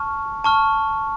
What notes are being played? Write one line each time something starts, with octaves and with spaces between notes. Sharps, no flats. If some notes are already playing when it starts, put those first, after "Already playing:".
Already playing: A5 C#6 F6
A5 C#6 F6